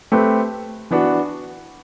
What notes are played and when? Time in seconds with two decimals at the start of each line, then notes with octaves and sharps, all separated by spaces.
0.12 A3 C4 G4 B4
0.91 E3 B3 D4 F#4